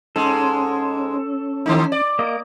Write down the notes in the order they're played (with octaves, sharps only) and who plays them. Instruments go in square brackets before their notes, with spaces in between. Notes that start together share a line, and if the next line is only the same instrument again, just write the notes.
[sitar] G#2 G#3 [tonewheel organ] C#4 [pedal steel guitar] A4
[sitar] D#3 A3 D#4
D5
[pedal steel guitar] A#3 D#5 [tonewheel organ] D6